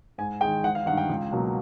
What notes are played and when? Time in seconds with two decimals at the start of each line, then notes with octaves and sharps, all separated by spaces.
0.18 G#2 G#5
0.41 D#3 G#3 G5
0.64 G#1 F#5
0.75 F5
0.86 G2 D#3 F#5
0.97 G5
1.09 C#2
1.32 B2 F#3 A#3